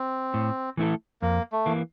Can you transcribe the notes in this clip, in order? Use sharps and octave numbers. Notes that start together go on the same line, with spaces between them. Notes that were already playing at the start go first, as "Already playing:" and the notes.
Already playing: C4
A2
E3 A3 E4 A4
F2 A#3
A3
E3 A#3